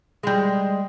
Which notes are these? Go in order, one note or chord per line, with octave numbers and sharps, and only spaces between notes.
G3 G#3